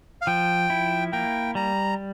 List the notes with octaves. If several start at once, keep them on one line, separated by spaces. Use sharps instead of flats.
F5
F3 G5
E4
A#3 G5
G3 A#5